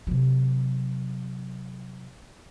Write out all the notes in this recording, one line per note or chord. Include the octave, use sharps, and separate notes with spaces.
C3 F#3